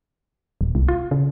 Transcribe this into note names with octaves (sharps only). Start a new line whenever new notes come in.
D#1
C2
F4
C#3